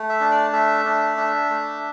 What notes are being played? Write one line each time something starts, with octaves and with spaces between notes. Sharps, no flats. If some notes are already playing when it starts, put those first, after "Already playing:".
Already playing: A3
E5
D4
D5
A3 E5
D4
D4
A3